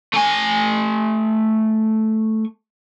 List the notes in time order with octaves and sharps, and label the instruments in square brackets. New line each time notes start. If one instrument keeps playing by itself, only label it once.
[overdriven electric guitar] A3 G#5